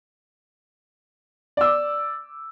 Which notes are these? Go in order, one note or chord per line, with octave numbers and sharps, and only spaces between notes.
D5 D6 E6